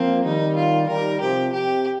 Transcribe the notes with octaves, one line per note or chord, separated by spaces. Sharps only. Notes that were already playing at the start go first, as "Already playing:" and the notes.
Already playing: F3 A#3 C4
D#3 G3 D#4
F4
D#3 G3 A#4
C3 F3 G4
C3 G4